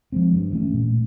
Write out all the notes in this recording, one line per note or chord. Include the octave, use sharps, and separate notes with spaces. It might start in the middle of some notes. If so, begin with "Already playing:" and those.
F3 G#3 C4
G2
E3 A3 C#4
A#2